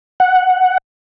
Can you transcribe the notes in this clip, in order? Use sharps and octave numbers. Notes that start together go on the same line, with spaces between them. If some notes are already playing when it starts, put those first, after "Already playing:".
F#5